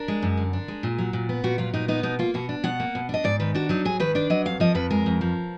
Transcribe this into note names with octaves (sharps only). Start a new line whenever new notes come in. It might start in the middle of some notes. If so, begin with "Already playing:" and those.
Already playing: D4 A#4
G#3
F#2
D3
D4
G#3
A#2
F#3
A#2
B3
A#2 F#4
F#3 F4
A#2 D#4
B3 D#4
B2 D#4
A#3 F4
B2 F#4
D4
B2 F#5
A#3
B2
D4 D#5
G#2 D5
D#3 B4
D4 F#4
F#3 D#4
G#2 G#4
D#3 B4
D4 D5
F#3 D#5
F2 F5
F3 D#5
F2 B4
G#3 A#4
F2
F3